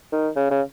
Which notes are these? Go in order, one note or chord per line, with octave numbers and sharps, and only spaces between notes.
D#3
C#3
C#3